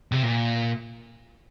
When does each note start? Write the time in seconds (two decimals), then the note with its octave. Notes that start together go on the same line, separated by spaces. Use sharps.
0.12 C3
0.22 A#2